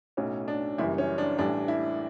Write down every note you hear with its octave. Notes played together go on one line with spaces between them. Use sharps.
B1 A2 F#3 C#4
D4
F#1 F#2 E3 G3 E4
C#4
D4
A1 A2 E3 G3 D4
E4